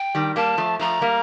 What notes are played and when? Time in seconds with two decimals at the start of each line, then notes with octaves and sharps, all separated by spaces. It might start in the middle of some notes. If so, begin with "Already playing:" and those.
Already playing: G5
0.15 D#3 G3
0.36 G3 A#3 A5
0.58 F3 A3
0.79 F3 A3 A#5
1.01 G3 A#3